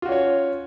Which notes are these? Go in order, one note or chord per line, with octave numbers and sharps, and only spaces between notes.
C#4 F4 F#4 C#5